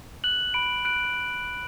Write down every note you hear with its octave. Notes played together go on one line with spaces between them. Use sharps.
F#6 F#7
B5 D7
F#6 D7